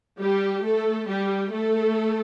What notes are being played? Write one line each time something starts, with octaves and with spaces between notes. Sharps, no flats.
G3 G4
A3 A4
G3 G4
A3 A4